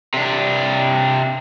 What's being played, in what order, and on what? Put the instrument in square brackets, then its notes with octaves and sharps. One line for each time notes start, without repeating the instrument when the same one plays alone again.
[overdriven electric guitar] C3 D4